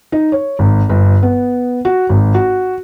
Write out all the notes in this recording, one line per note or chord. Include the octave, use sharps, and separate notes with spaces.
D#4
C#5
G#1
G1
B3
F#4
G#1
F#4